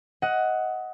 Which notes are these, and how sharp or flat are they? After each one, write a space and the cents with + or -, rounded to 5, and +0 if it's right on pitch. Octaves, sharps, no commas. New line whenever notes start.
D#5 +20 F#5 +5